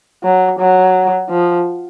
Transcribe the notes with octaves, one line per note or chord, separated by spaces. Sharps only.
F#3
F#3
F3